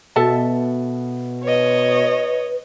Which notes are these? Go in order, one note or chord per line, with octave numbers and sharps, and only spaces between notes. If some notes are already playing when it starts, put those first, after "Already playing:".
B2 A4 E5 A5
B4 C#5 D#5